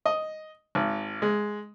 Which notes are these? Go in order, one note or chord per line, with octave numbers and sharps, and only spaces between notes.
D#5
G#1
G#3